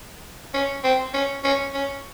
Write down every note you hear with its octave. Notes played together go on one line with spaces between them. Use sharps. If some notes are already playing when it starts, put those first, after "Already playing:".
C#4
C4
C#4
C#4
C#4